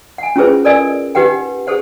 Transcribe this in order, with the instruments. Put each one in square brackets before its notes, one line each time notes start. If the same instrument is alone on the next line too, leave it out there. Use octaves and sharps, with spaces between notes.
[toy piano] F#5 G#5
C#4 E4 F4 G#4 B4 C5
A4 A#4 D5 D#5 G#5 E6
D#4 G4 B4 F#5 G5
G#4 A4 C5 F#5